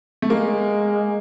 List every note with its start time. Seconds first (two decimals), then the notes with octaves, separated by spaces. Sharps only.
0.22 A3
0.30 G#3 A#3